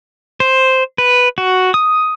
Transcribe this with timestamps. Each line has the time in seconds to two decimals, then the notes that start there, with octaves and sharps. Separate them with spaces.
0.40 C5
0.98 B4
1.38 F#4
1.74 D#6